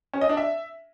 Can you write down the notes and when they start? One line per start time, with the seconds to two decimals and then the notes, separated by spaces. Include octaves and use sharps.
0.13 C#4
0.21 D#5
0.29 D4
0.37 E5